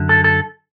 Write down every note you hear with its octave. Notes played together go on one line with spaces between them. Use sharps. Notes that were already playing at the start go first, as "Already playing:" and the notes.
Already playing: F#2 D3
A4
A4